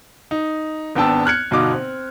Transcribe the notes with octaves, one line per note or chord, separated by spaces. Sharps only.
D#4
G#1 B3 D4 G5 A5 E6
F6 F#6 G#6 C#7
G1 B2 D#4 F5 D6
C4